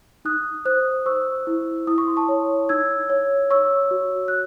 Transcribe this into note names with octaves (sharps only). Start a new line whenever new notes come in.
D#4 D#6 F#6
C5 D#6 F#6
C5 C#6 E6
E4
E4 D#6
C#6
C6
A5 C#6
C#5
D#4 E6 G#6
C#5
C#5 C#6 E6
F#4
F#6